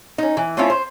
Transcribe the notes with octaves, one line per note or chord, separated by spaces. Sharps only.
C#4 D#4
E3
A3 C4 C#4 E4 F4
C5